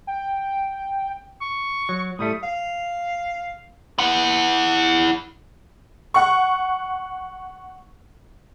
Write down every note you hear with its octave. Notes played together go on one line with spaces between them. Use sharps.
G5
C#6
F#3
A2 G3 A3 D#6
F5
E4 F#5
F#5 C#6